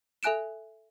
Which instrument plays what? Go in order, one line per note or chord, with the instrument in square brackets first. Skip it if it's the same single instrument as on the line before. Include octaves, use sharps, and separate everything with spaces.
[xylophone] A4 E5 G#5 F#6 D7 E7